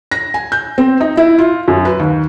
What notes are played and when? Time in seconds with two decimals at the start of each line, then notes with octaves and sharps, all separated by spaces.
0.12 A#6
0.34 G#5
0.52 G6
0.78 C4
1.01 D#4
1.17 E4
1.39 F4
1.68 F#2
1.85 B4
1.99 D#2